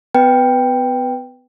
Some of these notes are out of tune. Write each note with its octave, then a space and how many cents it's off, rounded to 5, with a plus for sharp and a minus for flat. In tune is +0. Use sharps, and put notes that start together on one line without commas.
B3 +35 B4 +0 G5 +0